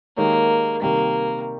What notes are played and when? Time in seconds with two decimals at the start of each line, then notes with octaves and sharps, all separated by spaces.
0.17 D#3 G#3 A#3 D#4 G4 C#5
0.82 C3 D#3 G3 A#3